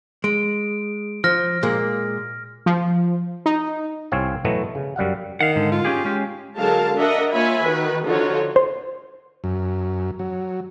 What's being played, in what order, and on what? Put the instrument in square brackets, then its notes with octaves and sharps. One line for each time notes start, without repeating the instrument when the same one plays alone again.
[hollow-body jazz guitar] G#3 [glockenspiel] D7
[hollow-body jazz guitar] F3 [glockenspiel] F6 A#6
[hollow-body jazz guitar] A#2 G#3 A#3
[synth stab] F3
D#4
[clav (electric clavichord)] C2 C4 C#5 F5 G#5
B2 E3 F#3 A3 B3
C#3
F#2 G3 F5 F#5
[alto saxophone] D#3 [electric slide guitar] F5 F#5
[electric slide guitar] G#2 D3
[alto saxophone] F4
[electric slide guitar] C#4 G4 G#4
G#3 C#4 G4
[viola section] D3 F#3 G#3 A#4 F5 A5
D4 A#4 D#5 E5 F#5
A#3 F4 C#5 E5 G#5 B5
D#3 F#4 B4
D3 F3 D#4 F4 F#4 C#5
[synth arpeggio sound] C5
[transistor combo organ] F#2
F#3